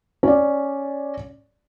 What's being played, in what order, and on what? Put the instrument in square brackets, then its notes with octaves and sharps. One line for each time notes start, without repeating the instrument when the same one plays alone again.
[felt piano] C#4 D5